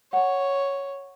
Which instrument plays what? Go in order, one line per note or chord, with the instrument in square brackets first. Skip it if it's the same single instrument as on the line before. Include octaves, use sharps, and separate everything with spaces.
[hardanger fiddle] C#5 [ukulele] F#5 A5